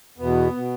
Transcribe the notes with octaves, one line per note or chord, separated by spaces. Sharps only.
E2 B2 B3
B2